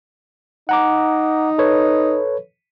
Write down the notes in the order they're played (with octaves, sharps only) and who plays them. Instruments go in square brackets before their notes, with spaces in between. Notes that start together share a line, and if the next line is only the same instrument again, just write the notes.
[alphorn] D#4 [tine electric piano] F#5 A#5 D6
[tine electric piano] A4 B4 C#5